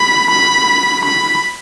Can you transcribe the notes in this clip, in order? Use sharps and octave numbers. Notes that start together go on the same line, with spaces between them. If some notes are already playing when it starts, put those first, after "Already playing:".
Already playing: B5
B5
B5